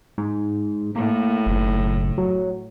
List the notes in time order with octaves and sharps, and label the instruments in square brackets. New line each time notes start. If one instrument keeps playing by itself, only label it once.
[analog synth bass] G#2
[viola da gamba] A2 [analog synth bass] A#3
[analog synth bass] F#1
F#3